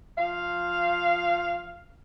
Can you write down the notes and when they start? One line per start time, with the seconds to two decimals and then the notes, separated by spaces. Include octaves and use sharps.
0.17 F3 F5